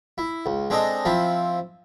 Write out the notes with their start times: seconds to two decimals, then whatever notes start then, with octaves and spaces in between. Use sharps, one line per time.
0.18 E4
0.46 C#2
0.70 G#3 C4 D4 A4 D#5
1.05 F3 C4 E4